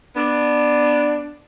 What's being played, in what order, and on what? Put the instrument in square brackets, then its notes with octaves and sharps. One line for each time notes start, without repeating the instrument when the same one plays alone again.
[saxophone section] B3 D4